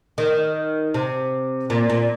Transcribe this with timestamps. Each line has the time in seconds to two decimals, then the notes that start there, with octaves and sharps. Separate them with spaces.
0.18 D#3
0.94 C3
1.70 A#2
1.90 A#2